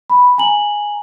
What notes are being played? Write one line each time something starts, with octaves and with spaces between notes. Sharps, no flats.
B5
G#5 A#5 F#7